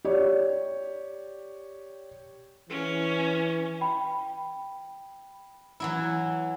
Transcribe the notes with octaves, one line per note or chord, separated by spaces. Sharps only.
G4 C#5 D5
E3 C#4
G5 B5
E3 F#3 E4